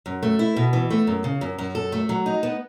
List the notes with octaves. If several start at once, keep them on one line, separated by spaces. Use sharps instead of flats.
F#2
A3
E4
B2
E3
A3
F#2
C#3
F#2
F#2
A4
A3
F#3
D#4
B3